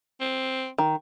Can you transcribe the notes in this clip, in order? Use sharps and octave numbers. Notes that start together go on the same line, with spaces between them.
C4
D#3